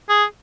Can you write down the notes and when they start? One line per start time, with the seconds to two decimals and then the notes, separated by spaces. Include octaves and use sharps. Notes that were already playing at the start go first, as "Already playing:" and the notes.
0.09 G#4